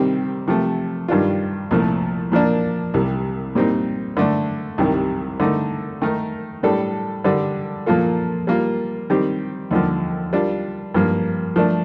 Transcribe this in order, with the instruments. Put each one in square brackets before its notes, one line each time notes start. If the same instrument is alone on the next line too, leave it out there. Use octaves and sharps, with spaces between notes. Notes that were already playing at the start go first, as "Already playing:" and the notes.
Already playing: [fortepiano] C3 D#3 G3 C4
C3 F3 A3
G2 D#3 G3 D4 F4
C2 A#2 F3 A3
A#2 F3 A#3 D4
C2 C3 G3
A#2 G3 C4 D#4
D3 A3 D4
C2 C3 D#3 G3
D3 A3 D#4
D#3 A3 D#4 A#4
A2 G3 D4 A4
D3 G3 D4
A#2 F3 A#3 F4 A4
G3 A#3 F4
D#3 G3 C4 G4
D#2 D3 F3
G3 D4 F4
G2 F3 A#3
F3 A3 D4